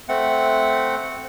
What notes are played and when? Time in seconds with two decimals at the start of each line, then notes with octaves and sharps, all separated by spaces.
0.09 A3 C4 F#5